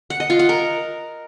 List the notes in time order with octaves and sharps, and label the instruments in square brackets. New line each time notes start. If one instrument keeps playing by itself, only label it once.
[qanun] F#5
D#5
F4
F#5
A#4